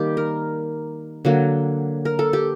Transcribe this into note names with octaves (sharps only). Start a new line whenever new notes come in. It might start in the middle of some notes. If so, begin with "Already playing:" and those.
Already playing: D#3 G3 A#3 G4
A#4
D3 F#3 A#3
A#4
A4
G4